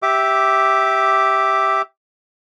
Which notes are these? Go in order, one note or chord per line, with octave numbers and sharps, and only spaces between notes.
G4 E5 D6